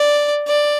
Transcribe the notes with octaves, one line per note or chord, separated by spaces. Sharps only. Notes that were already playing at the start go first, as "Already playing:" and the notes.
Already playing: D5
D5